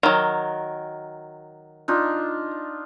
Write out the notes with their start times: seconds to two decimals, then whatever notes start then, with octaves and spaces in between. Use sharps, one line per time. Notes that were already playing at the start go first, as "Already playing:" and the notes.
0.03 D#3 F#3
1.88 D4 D#4 F4